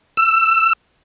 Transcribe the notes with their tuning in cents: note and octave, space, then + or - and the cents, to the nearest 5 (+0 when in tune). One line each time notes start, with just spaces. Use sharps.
E6 +20